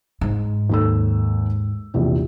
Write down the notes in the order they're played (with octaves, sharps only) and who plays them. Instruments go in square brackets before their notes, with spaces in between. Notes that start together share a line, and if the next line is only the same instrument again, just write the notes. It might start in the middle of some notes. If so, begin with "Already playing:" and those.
[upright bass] G#2
[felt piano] D#2 A4 E6
A#1 E2 C3